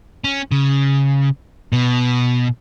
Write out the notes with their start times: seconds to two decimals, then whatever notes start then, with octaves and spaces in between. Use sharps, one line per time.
0.24 C#4
0.52 C#3
1.73 B2